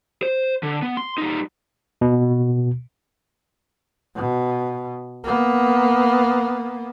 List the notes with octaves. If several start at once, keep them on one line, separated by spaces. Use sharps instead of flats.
C5
D3
B3
C6
G3 D#4
B2
B2
A#3 B3